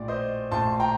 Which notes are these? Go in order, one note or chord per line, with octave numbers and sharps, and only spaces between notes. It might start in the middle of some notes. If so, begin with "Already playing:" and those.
Already playing: A#1 A2 D5
C5 D#5
A#1 A2 A5 C6
G5 A#5